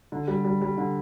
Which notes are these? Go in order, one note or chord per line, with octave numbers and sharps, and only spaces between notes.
D3
G3
G3
G3
D3